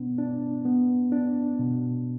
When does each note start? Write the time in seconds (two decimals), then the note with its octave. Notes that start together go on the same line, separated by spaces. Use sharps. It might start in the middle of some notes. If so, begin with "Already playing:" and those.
Already playing: B2 B3 D4
0.18 D4
0.65 B3
1.12 D4
1.59 B2